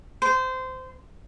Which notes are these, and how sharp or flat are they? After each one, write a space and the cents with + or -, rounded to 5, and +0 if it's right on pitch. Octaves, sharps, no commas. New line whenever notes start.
C5 -20